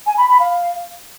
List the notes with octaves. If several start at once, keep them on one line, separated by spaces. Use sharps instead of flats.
G#5
B5
B5
F5